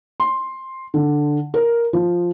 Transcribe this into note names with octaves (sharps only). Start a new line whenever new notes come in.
C6
D3
A#4
F3